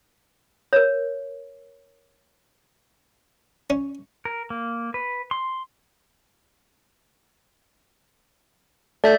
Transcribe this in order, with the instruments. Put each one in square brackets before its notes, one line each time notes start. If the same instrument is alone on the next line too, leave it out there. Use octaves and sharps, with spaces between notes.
[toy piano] A#4 C#5
[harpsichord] C#4
[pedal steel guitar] A#4
A#3
B4
C6
[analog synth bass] A3 [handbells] D5 E5 G6